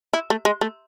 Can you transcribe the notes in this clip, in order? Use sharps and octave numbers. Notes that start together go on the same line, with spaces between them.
E4
A3
G#3
A3